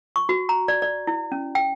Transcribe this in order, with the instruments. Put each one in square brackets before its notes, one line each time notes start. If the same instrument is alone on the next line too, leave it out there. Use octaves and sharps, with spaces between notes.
[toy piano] C#6
F#4
A#5
D5
D5
E4
C#4
G5